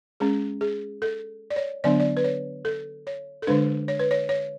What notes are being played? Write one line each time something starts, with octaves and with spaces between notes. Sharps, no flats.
G#3 C#4 G#4
G#4
A4
D5
C#5
D3 F#3 B3 D4 D5
D5
B4
C#5
A4
C#5
A4
D3 G#3 D4 B4
C#5
B4
C#5
C#5